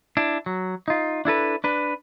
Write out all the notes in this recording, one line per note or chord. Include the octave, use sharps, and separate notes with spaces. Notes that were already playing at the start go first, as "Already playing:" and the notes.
D4 E4
F#3
D#4 F4
D4 E4 A4 B4
D4 B4